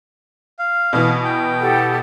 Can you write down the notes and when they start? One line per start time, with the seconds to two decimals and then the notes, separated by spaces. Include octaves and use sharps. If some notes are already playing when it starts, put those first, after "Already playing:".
0.59 F5
0.93 B2 E3
1.24 G5
1.60 G4 A4 F#5